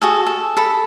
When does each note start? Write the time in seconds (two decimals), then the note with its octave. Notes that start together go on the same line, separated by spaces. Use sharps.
0.02 F#4 G#4 A4
0.26 A4
0.57 A4 B5